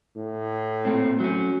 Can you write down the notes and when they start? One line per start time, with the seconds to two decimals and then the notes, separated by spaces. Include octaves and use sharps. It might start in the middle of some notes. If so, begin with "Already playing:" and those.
0.17 A2
0.85 A#2 A3 C4
1.20 F#3 C#4